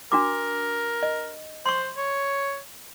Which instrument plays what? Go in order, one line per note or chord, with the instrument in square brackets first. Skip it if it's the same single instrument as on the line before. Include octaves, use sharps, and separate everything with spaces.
[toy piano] D4 F#4 D6 [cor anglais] A#4
[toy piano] D#5
[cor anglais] C5 [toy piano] C6 C#6
[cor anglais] C#5